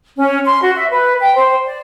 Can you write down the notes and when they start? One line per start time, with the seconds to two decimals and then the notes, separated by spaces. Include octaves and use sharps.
0.17 C#4
0.44 C6
0.62 F#4
0.76 E5
0.90 B4
1.20 G5
1.35 C5
1.65 D5